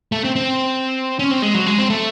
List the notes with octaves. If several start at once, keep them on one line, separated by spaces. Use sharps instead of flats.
A3
C4
C4
C#4
C4
G#3
F#3
G#3
C4
A3